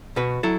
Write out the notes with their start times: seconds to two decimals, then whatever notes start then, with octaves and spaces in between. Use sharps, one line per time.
0.16 B2 F#4 B4
0.43 F#3 E4 A4